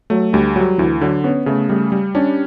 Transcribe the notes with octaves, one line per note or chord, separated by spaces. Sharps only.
F#3 A3
D2 G3
F#3 G3
D2 E3
D3 F#3
B3 C#4
C#3 A3
G3 A3
G3
C#4 D4